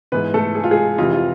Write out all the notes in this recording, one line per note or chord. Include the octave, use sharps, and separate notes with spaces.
G#2 E3 B3 B4
A3 A4
G#4
F4
G#3 G#4
F2 C3 E3 F4
F4